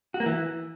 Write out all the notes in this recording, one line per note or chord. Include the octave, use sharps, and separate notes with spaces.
F#4
A#3
E3